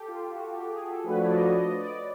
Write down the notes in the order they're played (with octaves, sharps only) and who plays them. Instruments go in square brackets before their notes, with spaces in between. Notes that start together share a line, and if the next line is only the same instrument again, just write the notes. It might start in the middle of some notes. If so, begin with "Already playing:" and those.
Already playing: [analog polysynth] G4 A4
F4
F#4
G4
G#4
A4
[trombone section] F3 A3 D4 F#4 [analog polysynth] B4
[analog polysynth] C#5
D5
D#5
D#5
D5